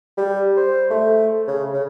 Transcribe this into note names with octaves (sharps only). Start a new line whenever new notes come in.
G3
C5
A3
C#3
C#3